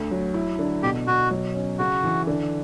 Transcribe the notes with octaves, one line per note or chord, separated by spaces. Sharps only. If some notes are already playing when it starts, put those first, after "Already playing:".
Already playing: D2
F#3
E4
D3
B2 G4
B2 F#4
F#3
C#4
C#3 F#4
E3
D3